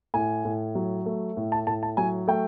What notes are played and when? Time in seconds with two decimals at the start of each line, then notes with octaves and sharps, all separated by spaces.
0.14 A2 G#5
0.45 A2
0.75 F#3
1.06 A3
1.37 A2
1.52 A5
1.67 A2 A5
1.83 A5
1.97 F#3 G#5
2.28 A3 G5